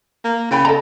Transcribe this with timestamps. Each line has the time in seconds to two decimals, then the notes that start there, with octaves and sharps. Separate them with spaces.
0.25 A#3
0.51 C#3 E4 G5 B5
0.65 A4 D#5 A#5